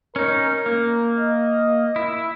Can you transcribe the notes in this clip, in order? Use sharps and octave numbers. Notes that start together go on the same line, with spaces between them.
C#4 D#4 A#4
A#3
D#5
E4